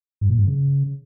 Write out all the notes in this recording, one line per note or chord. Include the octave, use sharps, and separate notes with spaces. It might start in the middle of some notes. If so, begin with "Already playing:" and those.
G2
A#2
G2
C#3